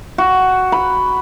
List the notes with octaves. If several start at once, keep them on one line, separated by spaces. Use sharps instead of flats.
F#4
B5